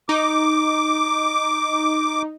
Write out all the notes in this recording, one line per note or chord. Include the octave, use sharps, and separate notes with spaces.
D#4 D6